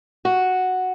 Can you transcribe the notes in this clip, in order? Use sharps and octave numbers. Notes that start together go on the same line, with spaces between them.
F#4